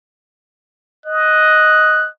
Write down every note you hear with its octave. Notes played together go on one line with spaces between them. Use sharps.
D#5 F#6